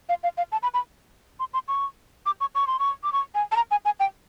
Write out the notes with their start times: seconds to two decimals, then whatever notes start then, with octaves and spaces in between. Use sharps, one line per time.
0.09 F5
0.23 F5
0.37 F5
0.52 A5
0.63 B5
0.74 B5
1.40 C6
1.54 C6
1.68 C#6
2.26 D6
2.41 C#6
2.55 C#6
2.67 C6
2.79 C#6
3.04 D6
3.13 C#6
3.35 G#5
3.52 A5
3.56 A#5
3.71 G#5
3.85 G#5
4.00 G5